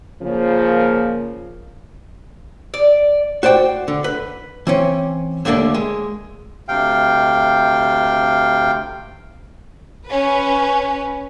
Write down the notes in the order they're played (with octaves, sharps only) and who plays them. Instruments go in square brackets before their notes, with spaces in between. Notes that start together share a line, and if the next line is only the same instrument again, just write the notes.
[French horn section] C#3 F3 A#3
[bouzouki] D5
[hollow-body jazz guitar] F#4 C5 D5 G5
D3
B4
E3 C4 C#4
D#2 D3 A3 A#3 D4
G#3
[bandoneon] D2 C3 F5 G5
[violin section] C#4 B4